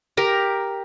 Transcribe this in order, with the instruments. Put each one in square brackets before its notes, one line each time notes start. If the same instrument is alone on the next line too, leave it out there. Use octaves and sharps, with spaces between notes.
[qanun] G4 A#4 A#5